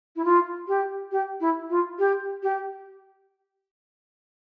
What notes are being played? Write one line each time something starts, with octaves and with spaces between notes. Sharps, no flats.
E4
F4
G4
G4
E4
F4
G4
G4